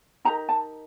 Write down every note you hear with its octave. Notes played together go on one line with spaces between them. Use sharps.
D#4 G4 A#4 A#5
A5